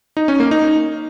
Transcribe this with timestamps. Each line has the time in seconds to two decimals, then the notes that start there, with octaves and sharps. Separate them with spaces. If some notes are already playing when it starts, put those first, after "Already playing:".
0.17 D#4
0.28 C#4
0.40 A#3
0.51 D#4